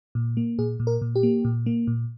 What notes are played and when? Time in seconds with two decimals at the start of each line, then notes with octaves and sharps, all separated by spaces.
0.15 A#2
0.37 A#3
0.59 A#2 G#4
0.80 A#2
0.87 A#4
1.02 A#2
1.16 G4
1.23 A#3
1.45 A#2
1.66 A#3
1.87 A#2